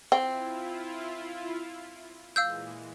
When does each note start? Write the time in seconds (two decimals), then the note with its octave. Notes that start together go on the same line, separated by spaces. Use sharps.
0.12 C4 E4 F4 G5
2.36 A#2 E3 G#3 F5 E6 G6